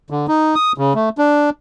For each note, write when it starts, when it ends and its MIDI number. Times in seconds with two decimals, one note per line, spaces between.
0.10 0.26 50
0.28 0.55 63
0.55 0.72 87
0.78 0.93 49
0.95 1.09 57
1.18 1.50 62